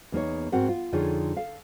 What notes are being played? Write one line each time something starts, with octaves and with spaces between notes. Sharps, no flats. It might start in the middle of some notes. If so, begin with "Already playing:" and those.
E2 A#3 D#4 C#5
G#2 C4 F#4 A#4 F#5
F4
F2 D3 D#4 F4 G#4 C#5
A4 F5